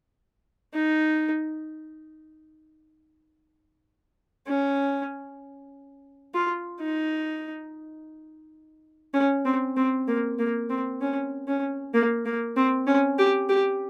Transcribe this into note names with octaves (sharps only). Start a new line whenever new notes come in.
D#4
C#4
F4
D#4
C#4
C4
C4
A#3
A#3
C4
C#4
C#4
A#3
A#3
C4
C#4
G4
G4